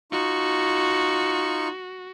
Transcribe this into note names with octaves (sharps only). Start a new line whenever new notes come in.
D#4 F4 F#4 C#6